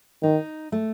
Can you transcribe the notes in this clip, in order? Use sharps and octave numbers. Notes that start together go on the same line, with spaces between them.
D#3 D#4
A3